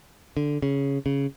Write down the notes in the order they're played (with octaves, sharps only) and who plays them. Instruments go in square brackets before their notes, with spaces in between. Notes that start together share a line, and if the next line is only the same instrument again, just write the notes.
[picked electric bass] D3
C#3
C#3